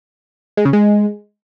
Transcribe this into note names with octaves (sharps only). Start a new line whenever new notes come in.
G#3
C#3
G#3